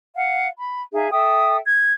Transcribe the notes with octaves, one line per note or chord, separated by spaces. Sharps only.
F5 F#5
B5
D#4 G#4 E5 F5
A4 E5 G5 D#6
G#6